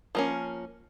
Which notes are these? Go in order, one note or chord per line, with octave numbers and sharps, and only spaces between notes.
F3 A#3 C#4